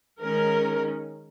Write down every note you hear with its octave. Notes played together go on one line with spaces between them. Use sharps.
D#3 G#3 C#4 A#4